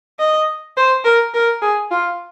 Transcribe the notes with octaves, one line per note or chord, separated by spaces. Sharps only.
D#5
C5
A#4
A#4
G#4
F4